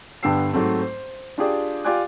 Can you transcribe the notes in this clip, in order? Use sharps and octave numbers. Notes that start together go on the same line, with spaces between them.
G2 D3 B3 G5 E6 C7
G#2 F#3 A3 C4
C5
D4 F4 G4 G#4 D5
F4 G4 D5 G#5 D6 F#6